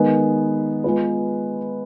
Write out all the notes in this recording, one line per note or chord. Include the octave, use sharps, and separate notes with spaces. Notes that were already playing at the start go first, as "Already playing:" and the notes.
Already playing: D#3 G#3 B3
G#3 B3 F4 B4